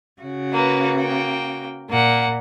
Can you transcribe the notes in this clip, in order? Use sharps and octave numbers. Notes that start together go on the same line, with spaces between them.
C#3 F#4
A#3 B4
A#3 G5
A#2 A#3 F#5